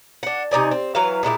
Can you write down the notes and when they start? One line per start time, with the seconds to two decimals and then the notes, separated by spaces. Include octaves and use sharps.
0.23 D4 F#5
0.51 C3 D#4 D5 G#5
0.71 C4
0.95 E3 F#3 B4 F5
1.23 A#2 G#3 E4 G4